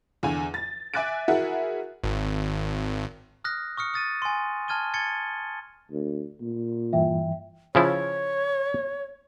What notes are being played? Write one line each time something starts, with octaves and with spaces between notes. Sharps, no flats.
E2 D3 G#5
A6
E5 G#5 D6 F#6 A6 D7
E4 F#4 G#4 A#4 E5 F#5
G#1
D#6 F6 F#6 A#6
C#6 D#6 F6 C#7
D#6 A6 D#7
G#5 C6
A5 F6 G#6 D#7 G7
G#6 A6 C#7 G7
D2
A#2
G2 E3 E5 G5
C#3 F3 E4 C#5